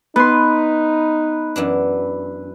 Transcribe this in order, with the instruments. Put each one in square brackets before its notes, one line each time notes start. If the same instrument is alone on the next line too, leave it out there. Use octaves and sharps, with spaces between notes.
[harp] B3 C6 [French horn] D#4 [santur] B4
[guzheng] F#2 E3 D4